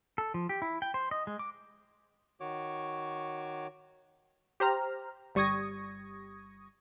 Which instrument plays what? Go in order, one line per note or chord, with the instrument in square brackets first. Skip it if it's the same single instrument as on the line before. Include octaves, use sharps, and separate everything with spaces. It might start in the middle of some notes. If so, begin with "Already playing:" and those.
[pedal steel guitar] A4
F3
G4
E4
G5
C5
D#5
G#3
D6
[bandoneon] D#3 F#4 C#5 D6
[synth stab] G4 C5 A#5 F6
G1 G3 C#6 D#6 G#6 A#6